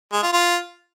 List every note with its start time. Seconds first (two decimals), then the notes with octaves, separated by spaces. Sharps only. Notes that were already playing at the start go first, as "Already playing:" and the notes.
0.12 G#3
0.23 F4
0.33 F4